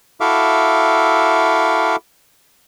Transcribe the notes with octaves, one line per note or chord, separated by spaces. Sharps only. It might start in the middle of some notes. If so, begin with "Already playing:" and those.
E4 F#4 A4 E5 F5 D6